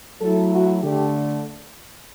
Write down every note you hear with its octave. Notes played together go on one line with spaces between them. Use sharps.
F#3 A3 E4 A4
F#4
D3 A3 G4